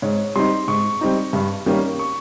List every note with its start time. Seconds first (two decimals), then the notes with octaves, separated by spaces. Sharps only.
0.02 G#2 C#5
0.36 G3 C4 D#4 C6
0.68 G#2 C#6
1.01 G3 C4 D#4
1.33 G2
1.66 D#3 G3 A#3 C#4
1.99 C#6